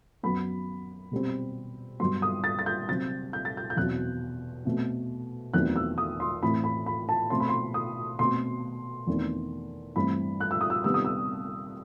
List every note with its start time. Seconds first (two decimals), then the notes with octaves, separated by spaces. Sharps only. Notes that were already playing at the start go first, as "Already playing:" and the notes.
0.23 F#2 F#3 B3 B5
1.11 B2 G3 C4
1.99 G2 F#3 B3 C6
2.22 D#6
2.44 A6
2.59 A6
2.66 G6
2.88 C3 F#3 C4 A6
3.33 G6
3.45 A6
3.57 G6
3.70 G6
3.76 E2 B2 F#3 C4 F#6
4.65 B2 A3 C4
5.53 E2 D#3 F#3 A3 C4 F#6
5.76 E6
5.98 D#6
6.20 C6
6.43 A2 E3 A3 C4 B5
6.64 B5
6.86 B5
7.09 A5
7.30 B2 A3 C4 C6
7.40 B5
7.48 C6
7.74 D#6
8.19 B2 A3 C4 C6
9.07 E2 D#3 A3 C4
9.96 G2 E3 A3 C4 B5
10.40 F#6
10.51 E6
10.61 D#6
10.70 E6
10.84 C3 D#3 G3 B3 E6
10.94 D#6
11.05 E6